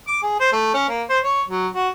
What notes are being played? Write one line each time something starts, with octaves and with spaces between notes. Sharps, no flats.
D6
G#4
C5
A3
C#4
A#3
C5
C#5
F#3
F#4